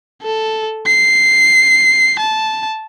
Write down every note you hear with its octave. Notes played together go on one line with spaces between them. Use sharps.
A4
C7
A5